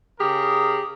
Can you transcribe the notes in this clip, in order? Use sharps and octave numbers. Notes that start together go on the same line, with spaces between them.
C#3 G4 G#4 A#4